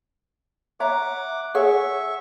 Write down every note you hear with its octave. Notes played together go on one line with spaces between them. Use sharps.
C#5 E5 F#5 A#5 D6
G#4 C#5 E5 F#5 C#6